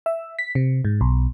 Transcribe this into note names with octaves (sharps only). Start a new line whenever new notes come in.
E5
B6
C3
G#2
B1